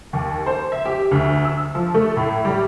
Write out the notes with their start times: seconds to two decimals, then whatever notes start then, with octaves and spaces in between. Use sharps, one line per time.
0.13 D#2
0.46 C5
0.72 E5
0.86 G4
1.11 D2
1.45 E6
1.75 F3
1.94 A3
2.17 A2
2.45 G3